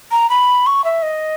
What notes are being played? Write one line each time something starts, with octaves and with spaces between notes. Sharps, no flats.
A#5
B5
C#6
E5
D#5